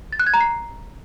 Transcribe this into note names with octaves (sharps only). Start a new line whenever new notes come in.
A6
F#6
G#6
A#5
C7